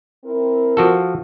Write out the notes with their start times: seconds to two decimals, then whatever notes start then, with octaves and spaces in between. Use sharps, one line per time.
0.25 C4 E4 A#4
0.77 F3 F#4 A4